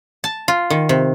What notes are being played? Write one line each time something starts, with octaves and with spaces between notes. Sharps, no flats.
A5
F4
D#3
C3